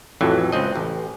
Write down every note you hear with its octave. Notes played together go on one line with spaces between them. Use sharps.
A1 F2 A2 E3 F#3
C#2 C4 D#5
A1